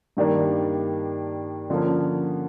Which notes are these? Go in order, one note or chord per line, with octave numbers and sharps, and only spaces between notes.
G2 D#3 G3 A#3 D4
D3 F3 A#3 C#4